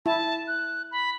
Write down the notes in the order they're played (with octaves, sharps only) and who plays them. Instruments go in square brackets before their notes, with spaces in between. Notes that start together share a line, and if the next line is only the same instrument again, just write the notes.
[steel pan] E4 [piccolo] A5
[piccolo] F#6
B5